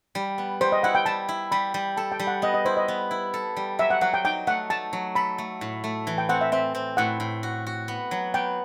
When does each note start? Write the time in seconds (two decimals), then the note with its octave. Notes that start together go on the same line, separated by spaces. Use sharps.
0.15 G3
0.38 B3
0.61 G3 C5
0.72 D#5
0.83 E4 F#5
0.95 G5
1.06 G3 A5
1.29 E4
1.52 G3 B5
1.74 G3
1.97 A4 A5
2.12 G5
2.19 G3
2.27 F#5
2.42 B3 D#5
2.54 D#5
2.65 E4 C5
2.77 D#5
2.88 B3
3.11 E4
3.34 A4
3.57 G3
3.79 F#3 E5
3.90 F#5
4.01 F#3 F#5
4.14 G5
4.25 D#4 G5
4.47 A3 F#5
4.70 A3 A5
4.93 F#3
5.15 A4 B5
5.38 A3
5.61 A2
5.84 A3
6.07 E3
6.18 G5
6.29 C4 F#5
6.41 E5
6.52 C4 E5
6.75 C4
6.97 A2 F#5
7.20 A2
7.43 F#4
7.67 F#4
7.88 B3
8.11 F#3
8.34 B3 G5